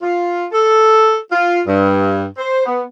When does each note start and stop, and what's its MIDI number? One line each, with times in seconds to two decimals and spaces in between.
0.02 0.46 65
0.53 1.15 69
1.32 1.61 65
1.67 2.24 43
2.38 2.64 72
2.66 2.82 59